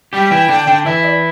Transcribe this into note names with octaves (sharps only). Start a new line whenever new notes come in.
G3 G4 G5
E3 E4
D3 D4
D3 D4
E3 E4 E5
D5